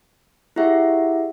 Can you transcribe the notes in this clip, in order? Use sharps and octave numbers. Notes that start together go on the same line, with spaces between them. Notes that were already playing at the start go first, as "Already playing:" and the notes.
E4 G4 G#4 E5 F#5